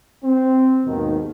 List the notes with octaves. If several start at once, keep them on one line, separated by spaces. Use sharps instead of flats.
C4
D#2 G#2 B2 D#3